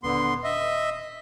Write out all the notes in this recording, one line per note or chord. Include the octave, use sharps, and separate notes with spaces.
D#1 D3 B3 C6
D#5 E5